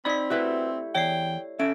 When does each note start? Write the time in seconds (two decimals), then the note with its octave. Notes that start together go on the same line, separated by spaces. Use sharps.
0.05 C4 D#4 D5 B5 B6
0.30 A3 E4 F#4 G4 B4
0.95 E2 C#5 D5 G5 C7
1.60 C#4 A4 E5 D7